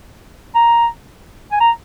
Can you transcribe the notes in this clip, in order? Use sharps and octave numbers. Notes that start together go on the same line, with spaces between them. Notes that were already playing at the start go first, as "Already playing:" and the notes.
A#5
G#5
A#5